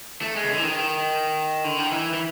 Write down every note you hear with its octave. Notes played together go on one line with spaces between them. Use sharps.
A3
G#3
C#3
D3
E3
D#3
D3
D#3
E3
E3